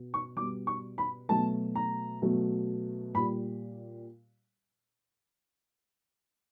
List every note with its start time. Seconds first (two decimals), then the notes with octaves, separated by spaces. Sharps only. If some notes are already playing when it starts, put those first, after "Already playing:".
Already playing: B2
0.14 C#6
0.36 B2 G3 D6
0.67 C#6
0.98 B5
1.29 B2 F#3 A3 A5
1.75 A#5
2.22 B2 F#3 A3
3.14 A#2 G3 B5